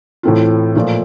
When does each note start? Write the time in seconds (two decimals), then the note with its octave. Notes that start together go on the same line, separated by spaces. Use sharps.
0.23 A2 E3 A3 C4 F4
0.75 A#2 F3 A3